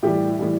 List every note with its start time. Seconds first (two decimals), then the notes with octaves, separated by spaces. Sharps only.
0.03 A2 E3 G3 G4
0.39 A2 E3 G3